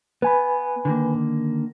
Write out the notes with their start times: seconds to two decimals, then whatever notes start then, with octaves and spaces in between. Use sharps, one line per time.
0.22 B3 B4 G#5 B5
0.85 D3 D#3 A#3